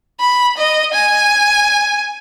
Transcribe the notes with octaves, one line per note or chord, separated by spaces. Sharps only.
B5
D#5
G#5